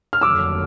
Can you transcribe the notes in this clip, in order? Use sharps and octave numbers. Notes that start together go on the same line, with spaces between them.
F6
F1 D#2 D3 F#3 D6 E6